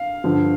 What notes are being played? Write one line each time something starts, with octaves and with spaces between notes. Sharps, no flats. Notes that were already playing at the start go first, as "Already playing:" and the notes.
Already playing: F5
G2 D3 F3